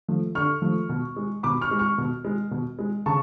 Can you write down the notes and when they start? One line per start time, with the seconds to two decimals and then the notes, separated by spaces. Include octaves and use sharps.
0.08 F3 A3
0.35 D3 C#6 F6
0.62 F3 A3
0.89 B2
1.16 G#3
1.43 B2 B5 D6
1.61 C#6 F6
1.71 G#3
1.79 C#6 F6
1.98 B2
2.25 G#3
2.51 B2
2.79 G#3
3.06 C#3 A5 C#6